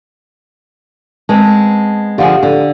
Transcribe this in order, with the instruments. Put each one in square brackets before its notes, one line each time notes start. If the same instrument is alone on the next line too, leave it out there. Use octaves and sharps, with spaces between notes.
[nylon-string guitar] G#3 B3 C4 [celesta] A5
[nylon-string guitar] D3 F3 G#4 [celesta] G4 F5 F#5
[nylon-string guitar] D3